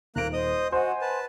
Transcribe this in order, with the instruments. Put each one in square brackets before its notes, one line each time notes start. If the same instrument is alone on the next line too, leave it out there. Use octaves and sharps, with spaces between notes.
[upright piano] D#1 D7 [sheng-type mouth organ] A#3 A#5 F#6
[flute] C5 [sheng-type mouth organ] D#5 D#6
[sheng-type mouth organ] F#4 [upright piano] C5 D#5 F#5 [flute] G#5
[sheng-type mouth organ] B4 A5